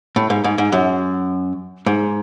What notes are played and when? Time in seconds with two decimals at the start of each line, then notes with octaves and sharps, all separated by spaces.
0.16 A2
0.30 G#2
0.44 G#2
0.58 G#2
0.72 F#2
1.86 G#2